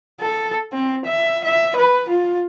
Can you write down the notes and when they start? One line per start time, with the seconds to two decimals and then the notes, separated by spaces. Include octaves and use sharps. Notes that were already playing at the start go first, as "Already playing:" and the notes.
0.21 A4
0.73 C4
1.05 E5
1.44 E5
1.76 B4
2.09 F4